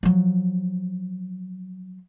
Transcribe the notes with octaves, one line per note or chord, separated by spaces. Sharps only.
F3 F#3